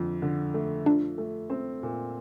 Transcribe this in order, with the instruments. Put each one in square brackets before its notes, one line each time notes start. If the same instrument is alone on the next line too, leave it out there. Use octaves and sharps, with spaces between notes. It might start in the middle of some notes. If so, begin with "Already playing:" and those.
Already playing: [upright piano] F2 D3
D3
A3
[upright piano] F3 [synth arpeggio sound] D4
[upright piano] A3
C4
A#2